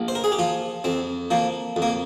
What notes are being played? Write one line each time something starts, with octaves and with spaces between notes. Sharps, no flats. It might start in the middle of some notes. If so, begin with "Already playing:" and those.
Already playing: A#1
C5
A#4
G#4
G4
F3 F4
F2 C4
F3 A#3
F2
A#3